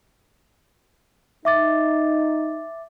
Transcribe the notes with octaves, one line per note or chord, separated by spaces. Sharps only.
D#4 E5 D6 A6